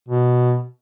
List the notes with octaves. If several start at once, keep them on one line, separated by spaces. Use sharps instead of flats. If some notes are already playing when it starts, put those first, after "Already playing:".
B2